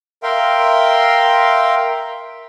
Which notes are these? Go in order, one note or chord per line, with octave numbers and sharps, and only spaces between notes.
A#4 E5 F5 G5 C6